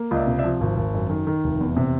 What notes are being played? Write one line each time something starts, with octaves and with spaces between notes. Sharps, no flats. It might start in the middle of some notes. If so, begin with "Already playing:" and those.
Already playing: A#3
C#2 D5 D#5 E5
C3
D5 E5
F3
G#1
G#1
F#2
D#3
D#3
F1
E2
C3